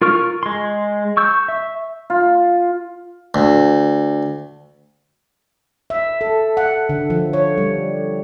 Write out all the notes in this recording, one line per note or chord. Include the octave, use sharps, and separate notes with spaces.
F4 A#4 C#6 F6
G#3 C6
C#6 E6 G6
E5
F4
D2
E5
A4
F#5
D3
F3
C#5
G3